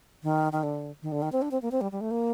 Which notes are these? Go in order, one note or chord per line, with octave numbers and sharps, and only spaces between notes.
D#3
D#3
D3
D#3
D3
D#3
C4
D4
C4
A#3
C4
G3
G3
A3
A#3